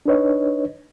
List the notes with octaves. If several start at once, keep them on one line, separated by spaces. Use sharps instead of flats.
D4 D#4 B4 C#5 D#5